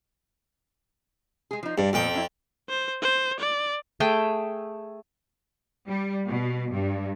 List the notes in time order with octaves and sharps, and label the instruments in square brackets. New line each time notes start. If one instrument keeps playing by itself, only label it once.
[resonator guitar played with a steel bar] G#3 G#4
F3 D#4
[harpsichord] G2 [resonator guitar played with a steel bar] D4
[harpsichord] F2 G5 [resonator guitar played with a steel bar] A#2 B3 A4
[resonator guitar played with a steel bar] F#3 C#4 E4
[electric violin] C5
C5
D5
[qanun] A3 G#4 G5
[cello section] G3
B2
G2